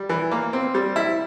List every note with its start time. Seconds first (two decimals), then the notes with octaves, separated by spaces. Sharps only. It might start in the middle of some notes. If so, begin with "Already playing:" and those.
Already playing: G3
0.09 E3
0.31 A#3
0.53 C4
0.74 G3
0.96 E4